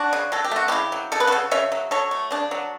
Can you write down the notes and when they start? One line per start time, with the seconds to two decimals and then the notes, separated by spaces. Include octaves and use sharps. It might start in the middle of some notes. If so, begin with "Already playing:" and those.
Already playing: D4 F#4
0.13 C#3
0.32 F#3 A4
0.44 G4
0.51 A3 F#4
0.68 C#3 E4 G4
0.92 F#3
1.12 C#3 A4
1.20 B4
1.27 C#3 F#4 A4
1.51 C#3 C#5 E5
1.72 F#3
1.91 F#3 A4 C#5
2.11 A3
2.31 C#3 D4
2.51 F#3